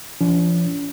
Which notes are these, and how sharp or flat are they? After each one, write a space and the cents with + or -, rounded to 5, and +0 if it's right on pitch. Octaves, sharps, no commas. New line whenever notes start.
F3 -30 C#4 +45